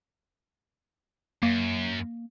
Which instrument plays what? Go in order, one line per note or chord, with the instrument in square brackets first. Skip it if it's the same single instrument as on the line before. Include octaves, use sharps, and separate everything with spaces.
[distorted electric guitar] F#2 [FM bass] A#3